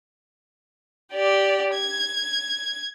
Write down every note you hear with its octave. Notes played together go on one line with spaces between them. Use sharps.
G4 D5
G#6